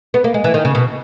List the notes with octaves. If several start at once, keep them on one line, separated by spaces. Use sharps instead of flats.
B3
A#3
G#3
E3
D#3
C#3
B2